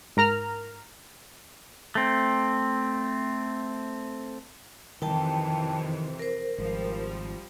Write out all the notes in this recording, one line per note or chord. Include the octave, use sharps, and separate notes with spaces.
G#2 A#4 A#5 F6
A3 C4
F2 C3 D#3 E3 G5 A5
A#4 C5
G#1 F3 G3